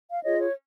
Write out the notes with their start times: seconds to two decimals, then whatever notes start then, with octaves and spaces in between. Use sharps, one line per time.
0.09 F5
0.23 F4 G#4 C#5 D#5
0.39 C#5